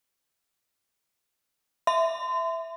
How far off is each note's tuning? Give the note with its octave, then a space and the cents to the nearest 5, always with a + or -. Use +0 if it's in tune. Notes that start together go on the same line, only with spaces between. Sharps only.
E5 +0 C6 -35